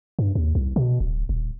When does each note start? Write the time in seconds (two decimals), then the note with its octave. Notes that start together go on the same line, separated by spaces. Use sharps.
0.19 G2
0.35 D#2
0.55 C2
0.76 B2
1.00 D1
1.29 D#1